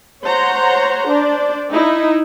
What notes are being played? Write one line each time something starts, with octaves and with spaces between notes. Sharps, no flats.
C5 C#5 F#5 A#5 C6
D4 C5 D5
D#4 E4